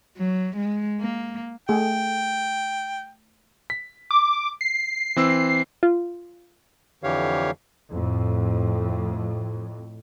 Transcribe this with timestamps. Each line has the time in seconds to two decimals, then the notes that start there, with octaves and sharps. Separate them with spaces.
0.18 F#3
0.57 G#3
1.01 A#3
1.69 A3 G#4 G5
3.70 B6
4.11 D6
4.61 C7
5.16 E3 C4 E6
5.83 F4
7.03 F2 D3 E3 G4 C#5 F5
7.91 F2 A2